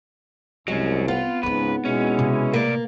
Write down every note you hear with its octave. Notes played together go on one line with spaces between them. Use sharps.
C2 F#3 G#3 C#4
B3 C4 F4
C#2 G#2 C#3 C4 D#4 B4
B2 G#3 C#4 E4
C3
A2 A#3 D5